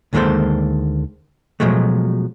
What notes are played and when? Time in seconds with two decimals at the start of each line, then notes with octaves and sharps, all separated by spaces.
0.13 D2 D#3 G#3 A#3 A4 C5
1.60 B2 F3 F#3 G#3 A3